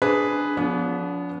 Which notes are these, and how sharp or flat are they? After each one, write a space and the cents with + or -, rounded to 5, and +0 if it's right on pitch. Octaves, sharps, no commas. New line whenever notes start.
D4 +0 G#4 +0 B4 +0
F3 +30 B3 +0 D4 -40